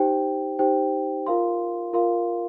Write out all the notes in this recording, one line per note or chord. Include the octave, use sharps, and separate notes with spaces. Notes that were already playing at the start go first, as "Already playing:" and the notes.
Already playing: D#4 G4 C5 G5
D#4 G4 C5 G5
F4 A#4 F5 C6
F4 A#4 F5 C6